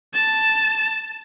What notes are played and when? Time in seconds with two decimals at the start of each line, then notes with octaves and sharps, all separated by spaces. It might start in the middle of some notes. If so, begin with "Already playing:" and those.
0.14 A5